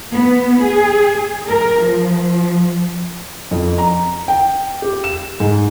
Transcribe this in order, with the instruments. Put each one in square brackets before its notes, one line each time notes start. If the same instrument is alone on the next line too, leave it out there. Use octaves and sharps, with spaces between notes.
[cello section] B3
G#4
A#4
F3
[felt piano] F2
A#5
G5
G4
E7
G#2